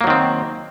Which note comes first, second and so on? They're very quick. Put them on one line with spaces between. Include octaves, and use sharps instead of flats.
A#3 F#3 D#3 C4